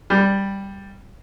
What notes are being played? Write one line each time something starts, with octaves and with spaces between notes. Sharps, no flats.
G3